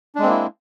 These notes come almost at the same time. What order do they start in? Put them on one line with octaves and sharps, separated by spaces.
D4 G#3 C4 A#3 E4